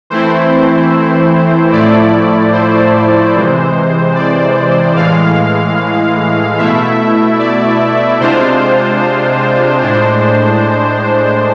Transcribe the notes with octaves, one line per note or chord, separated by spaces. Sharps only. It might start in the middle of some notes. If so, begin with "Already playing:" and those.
E3 A3 C4 E4 C5
A2 F3 A3 E4 D5
C5
C3 E3 G#3
D5
A2 E3 G#3 F5
B2 A3 E4 E5
D5
C3 G#3 D4 F4 C5
A2 G#3 D4